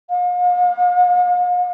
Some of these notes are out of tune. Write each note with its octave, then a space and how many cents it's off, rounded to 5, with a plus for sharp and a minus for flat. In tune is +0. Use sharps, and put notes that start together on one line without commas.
F5 +45